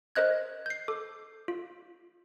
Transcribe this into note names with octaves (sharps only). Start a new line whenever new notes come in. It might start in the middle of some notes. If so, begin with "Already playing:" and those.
A#4 C5 D#5 F#6 G#6
G6 C7
A4 D6
F4